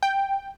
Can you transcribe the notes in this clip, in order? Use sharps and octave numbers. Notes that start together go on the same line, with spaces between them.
G5